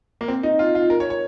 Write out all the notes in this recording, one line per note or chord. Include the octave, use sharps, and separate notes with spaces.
A#3
C4
D#4
F4
F4
A#4
C#5
C#5